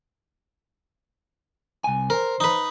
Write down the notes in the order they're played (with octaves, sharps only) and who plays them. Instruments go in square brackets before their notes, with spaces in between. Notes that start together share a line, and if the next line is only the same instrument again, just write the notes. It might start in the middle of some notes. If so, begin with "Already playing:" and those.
[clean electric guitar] C2 G#5
[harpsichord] A#4 [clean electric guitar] C5
[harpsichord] D#4 B4